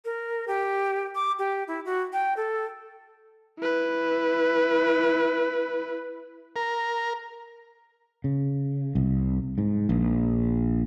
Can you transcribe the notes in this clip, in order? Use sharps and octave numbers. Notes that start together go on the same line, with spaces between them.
A#4
G4
D6
G4
E4
F#4
G5
A4
E4 B4
A#4
C#3
C2
G#2
A#1